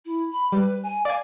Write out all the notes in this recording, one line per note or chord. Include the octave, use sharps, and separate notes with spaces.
E4
B5
G3 B4
G#5
D5 F5 G#5